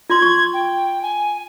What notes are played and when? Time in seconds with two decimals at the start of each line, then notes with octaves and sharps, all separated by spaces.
0.10 F4 C6 G#6
0.22 C#6
0.53 G5
1.02 G#5